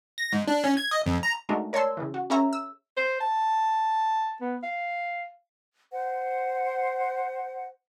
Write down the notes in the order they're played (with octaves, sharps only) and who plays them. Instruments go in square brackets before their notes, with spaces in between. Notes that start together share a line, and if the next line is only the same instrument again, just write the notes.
[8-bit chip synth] A#6
G#2
D4
C#4
G#6
D#5
F2
A#5
[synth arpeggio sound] G#3 A3 D4 D#4 F#4 A#4
A#4 C#5 D5 A5 C6 E6
C#3 E3
F#4
C#4 G#4 A#4 C#5 E5 A#5
E6
[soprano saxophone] C5
A5
B3
F5
[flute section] C5 F#5